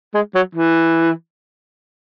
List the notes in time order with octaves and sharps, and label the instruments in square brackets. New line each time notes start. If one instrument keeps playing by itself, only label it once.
[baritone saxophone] G#3
F#3
E3